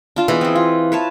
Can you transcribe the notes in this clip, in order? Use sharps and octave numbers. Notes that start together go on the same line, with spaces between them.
D4 F4 A5
E3 B3 G#4 D#5
C4 G#4
F4
B4 C#5 A5